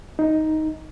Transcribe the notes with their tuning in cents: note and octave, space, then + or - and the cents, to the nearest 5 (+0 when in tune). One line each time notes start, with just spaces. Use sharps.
D#4 +5